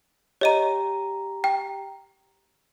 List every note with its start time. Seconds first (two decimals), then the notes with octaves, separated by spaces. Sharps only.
0.41 G4 C#5 D#5 A#5 D#7
1.44 G5